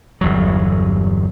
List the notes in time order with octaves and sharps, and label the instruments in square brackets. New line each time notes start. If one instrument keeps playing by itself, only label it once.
[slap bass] G1 E2 F#3